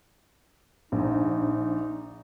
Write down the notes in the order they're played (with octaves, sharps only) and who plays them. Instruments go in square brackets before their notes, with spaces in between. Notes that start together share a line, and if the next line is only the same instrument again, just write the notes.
[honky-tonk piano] A#1 [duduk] D#4